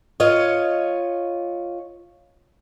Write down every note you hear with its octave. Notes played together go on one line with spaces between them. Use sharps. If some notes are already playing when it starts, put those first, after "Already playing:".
F4 C#5 D#5